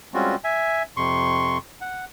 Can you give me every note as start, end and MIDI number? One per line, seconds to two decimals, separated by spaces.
0.14 0.35 55
0.14 0.35 56
0.14 0.35 60
0.14 0.35 61
0.14 0.35 65
0.14 0.35 66
0.44 0.83 76
0.44 0.83 80
0.97 1.58 41
0.97 1.58 48
0.97 1.58 84
0.97 1.58 85
1.81 2.05 78